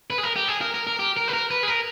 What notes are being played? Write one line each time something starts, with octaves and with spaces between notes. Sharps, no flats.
B4
G#4
A#4
G4
G#4
A#4
A#4
A#4
G4
A#4
B4
A#4
B4
G#4
A#4